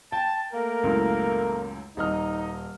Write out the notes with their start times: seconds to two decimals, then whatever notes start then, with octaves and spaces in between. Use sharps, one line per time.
0.12 G5 A5
0.53 A3 A#3 A#4
0.83 C#2 F#2 A2
1.97 D#1 D#4 D#5 F6